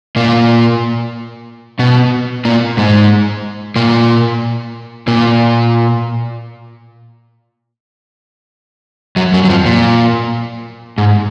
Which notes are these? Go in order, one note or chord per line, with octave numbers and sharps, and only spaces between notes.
A#2 A#3
B2 B3
A#2 A#3
G#2 G#3
A#2 A#3
A#2 A#3
F#2 F#3
F#2 F#3
F#3
F2 F3
A#2
G#2